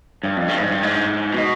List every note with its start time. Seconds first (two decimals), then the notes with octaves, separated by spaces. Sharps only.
0.23 G2
0.37 F2
0.48 G2
0.60 G#2
0.71 G2
0.83 G#2
1.32 B2